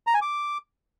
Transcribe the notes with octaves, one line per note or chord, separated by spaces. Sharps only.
A#5
G#5
D6